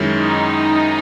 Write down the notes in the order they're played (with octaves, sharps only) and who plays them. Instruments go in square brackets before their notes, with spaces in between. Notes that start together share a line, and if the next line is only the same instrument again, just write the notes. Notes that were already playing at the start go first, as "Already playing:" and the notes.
Already playing: [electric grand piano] F#2 D#3 G#3 C#4 E4
[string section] D#4